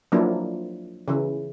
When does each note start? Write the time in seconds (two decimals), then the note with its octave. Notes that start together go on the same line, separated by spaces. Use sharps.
0.12 F3 F#3 A#3 D4 E4
1.08 C#3 E3